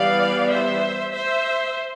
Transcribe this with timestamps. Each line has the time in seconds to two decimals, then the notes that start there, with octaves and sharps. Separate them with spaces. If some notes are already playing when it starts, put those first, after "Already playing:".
Already playing: E3 G3 B3 D5 F5
0.51 C5 E5
1.12 C5 E5